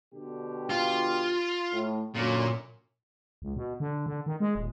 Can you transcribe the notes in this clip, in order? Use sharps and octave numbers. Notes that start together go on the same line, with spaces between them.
B2 D3 G4
F4
A2
F#2 A#2 D3
C#2
B2
D3
D3
D#3
G#3
D#1